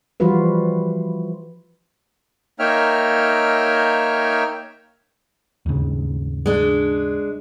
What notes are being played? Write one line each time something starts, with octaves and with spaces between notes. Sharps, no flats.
E3 F3 G3 F4 F#4 B4
A#3 D#4 C#5 E5 G5 F6
D#2 G#2 C#3
G#3 D4